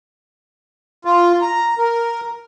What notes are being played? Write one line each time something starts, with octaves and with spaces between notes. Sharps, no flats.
F4
A#5
A#4